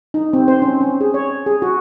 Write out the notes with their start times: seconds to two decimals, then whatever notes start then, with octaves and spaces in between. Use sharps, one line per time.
0.14 D#4
0.33 C4
0.48 C5
0.62 C#4
0.81 C#4
1.01 G#4
1.14 C#5
1.46 G#4
1.62 F#4